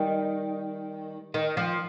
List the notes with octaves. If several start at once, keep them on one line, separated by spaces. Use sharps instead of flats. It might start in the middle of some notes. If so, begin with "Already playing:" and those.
Already playing: D#3 G3
D#3
F3